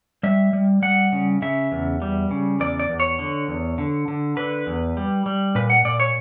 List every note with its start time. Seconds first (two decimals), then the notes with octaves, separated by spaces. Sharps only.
0.23 G3 E5
0.53 G3
0.82 G3 F#5
1.12 C#3
1.42 C#3 E5
1.72 E2
2.02 G3
2.31 C#3
2.60 E2 D5
2.79 D5
2.90 E2
3.00 C#5
3.19 D3
3.48 E2
3.78 D3
4.08 D3
4.37 D3 B4
4.67 E2
4.97 G3
5.26 G3
5.55 A#2 B4
5.70 F#5
5.85 A#2 D5
6.00 C#5